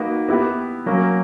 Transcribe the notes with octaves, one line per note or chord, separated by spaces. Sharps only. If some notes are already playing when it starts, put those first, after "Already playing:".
Already playing: A#3 D#4 F#4 B4
B3 E4 G4 B4
F#3 A#3 C#4